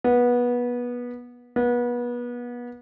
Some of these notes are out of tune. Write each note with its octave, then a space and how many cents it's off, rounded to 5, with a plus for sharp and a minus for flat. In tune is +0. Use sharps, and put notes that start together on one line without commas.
B3 -20
B3 -30